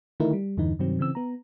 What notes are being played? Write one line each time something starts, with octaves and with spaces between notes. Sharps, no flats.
D3 D#3 A3 D#4 E4 A#4
G3
E2 G2 D3 E3 D#4
G2 C3 D#3 F#3 C4
C#3 E3 C4 E6
B3 A#5